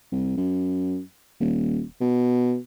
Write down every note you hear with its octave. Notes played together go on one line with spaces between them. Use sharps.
C2
F#2
D#1
B2